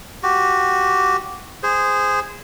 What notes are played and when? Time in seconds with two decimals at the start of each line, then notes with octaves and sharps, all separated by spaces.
0.23 F#4 G4
1.63 G#4 C5